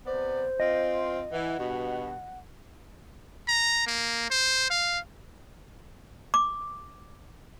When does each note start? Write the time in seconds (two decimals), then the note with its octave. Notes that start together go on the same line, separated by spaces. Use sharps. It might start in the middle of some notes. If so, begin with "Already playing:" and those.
0.06 C3 B3 C5 D5
0.60 C4 F4 D#5
1.32 E3 F#5
1.58 G2 B2
3.48 A#5
3.87 A#3
4.31 C5
4.70 F5
6.34 D6